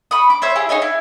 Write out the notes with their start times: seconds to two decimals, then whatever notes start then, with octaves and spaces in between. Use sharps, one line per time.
0.11 B5 C#6 D#6
0.30 D6
0.42 C5 C#5 E5
0.56 E4 G4 G#4
0.69 D#4 G#4 C#5 D#5
0.82 E4